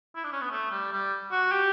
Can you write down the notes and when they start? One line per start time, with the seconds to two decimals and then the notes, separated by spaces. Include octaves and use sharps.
0.16 E4
0.24 D4
0.33 C#4
0.42 B3
0.51 A3
0.71 G3
0.92 G3
1.32 F#4
1.52 G4